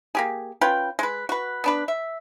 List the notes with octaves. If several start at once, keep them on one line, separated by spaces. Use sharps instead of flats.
A#3 G4 G#4
C#4 F4 B4 G5
G#3 B4
F#4 B4
B3 D4 B4
E5